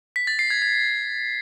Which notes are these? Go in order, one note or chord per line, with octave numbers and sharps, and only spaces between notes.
B6
A6
C7
G#6
G#6